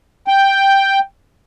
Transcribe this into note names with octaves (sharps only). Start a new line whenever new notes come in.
G5